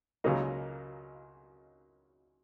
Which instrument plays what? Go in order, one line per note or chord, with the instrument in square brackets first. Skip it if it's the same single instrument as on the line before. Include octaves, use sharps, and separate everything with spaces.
[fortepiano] C#2 C#3 F#3 A#3 D#4